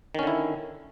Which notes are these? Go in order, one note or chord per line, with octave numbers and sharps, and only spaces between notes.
D3 D#3 C#4 E4